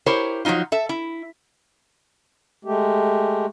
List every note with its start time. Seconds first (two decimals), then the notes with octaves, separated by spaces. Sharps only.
0.06 E4 G4 A#4 C5 C#5
0.45 F3 F#3 G#3 D#4 F4
0.72 A4 E5
0.89 E4
2.65 G#3 A3 G4